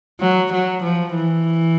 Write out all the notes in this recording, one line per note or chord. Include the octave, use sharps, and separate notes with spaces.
F#3
F#3
F3
E3